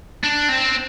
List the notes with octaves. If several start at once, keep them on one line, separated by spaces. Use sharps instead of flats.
D4
C4